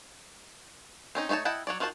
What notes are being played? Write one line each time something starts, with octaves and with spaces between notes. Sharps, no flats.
C4 C#4 D#4
A3 D#4 C5 C#5 A5
E4 D#5 F#5 G5 A5
F#3 C#5 D5
D#3 F4 F#4 C5 A5